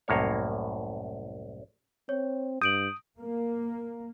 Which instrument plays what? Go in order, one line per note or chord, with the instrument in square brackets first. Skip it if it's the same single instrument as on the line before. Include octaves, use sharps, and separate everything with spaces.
[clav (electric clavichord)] C2 F#2 A2 A#3 C#5
[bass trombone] C4 [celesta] C#5
[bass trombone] G2 [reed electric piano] D#6 [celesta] G6 D7 F#7
[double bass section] A#3